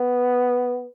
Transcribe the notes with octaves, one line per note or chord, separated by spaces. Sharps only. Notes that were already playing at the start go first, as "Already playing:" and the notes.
Already playing: B3